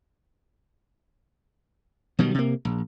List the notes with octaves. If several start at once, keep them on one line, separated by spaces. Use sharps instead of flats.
B2 D#3 F#3 G3
C3 A#3
A#1